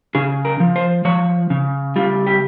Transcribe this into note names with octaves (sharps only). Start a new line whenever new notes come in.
C#3 G#4
A#4
F3
C5
F3 C#5
C#3
G3 F4
G4